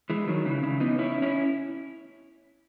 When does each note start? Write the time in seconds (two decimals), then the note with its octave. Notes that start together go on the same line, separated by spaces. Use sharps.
0.10 E3 G#3
0.28 D#3 F#3
0.45 C#3 E3
0.63 C#3 E3
0.80 B3 D#4
0.98 C#4 E4
1.22 C#4 E4